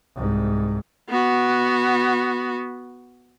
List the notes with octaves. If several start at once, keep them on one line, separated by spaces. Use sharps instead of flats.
C2 G#2
B3 F#4